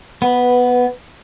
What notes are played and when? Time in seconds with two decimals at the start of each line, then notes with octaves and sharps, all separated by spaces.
0.22 B3 B4